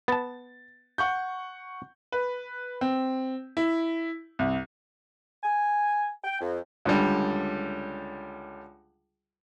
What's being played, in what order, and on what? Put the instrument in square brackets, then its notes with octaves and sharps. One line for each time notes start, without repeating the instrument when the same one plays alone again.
[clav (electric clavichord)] B3 A5 [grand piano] A6
[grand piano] F#5 C#6 G6
B4
C4
E4
C2
[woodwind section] G#5
G5
F2
[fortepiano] C#2 D3 G3